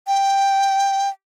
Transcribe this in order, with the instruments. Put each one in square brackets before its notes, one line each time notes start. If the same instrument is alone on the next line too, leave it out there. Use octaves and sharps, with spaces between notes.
[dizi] G5